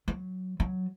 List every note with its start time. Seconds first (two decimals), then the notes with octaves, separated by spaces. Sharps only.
0.08 F#3
0.60 F#3